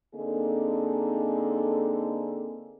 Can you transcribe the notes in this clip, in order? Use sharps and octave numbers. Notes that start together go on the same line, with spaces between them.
D3 A#3 C4 D#4 G#4 A4